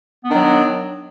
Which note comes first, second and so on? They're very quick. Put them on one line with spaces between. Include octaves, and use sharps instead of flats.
B3 D4 D#3 F#3